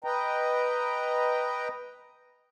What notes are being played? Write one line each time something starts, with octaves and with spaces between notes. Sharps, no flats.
B4 D#5 G5 A#5